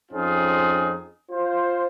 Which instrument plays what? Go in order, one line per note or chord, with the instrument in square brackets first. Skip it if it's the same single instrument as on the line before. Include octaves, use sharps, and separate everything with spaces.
[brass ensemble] F2 C4 C#4 D#4 F4 G#4
F4 C5